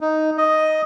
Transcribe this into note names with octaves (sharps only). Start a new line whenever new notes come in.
D#4
D#5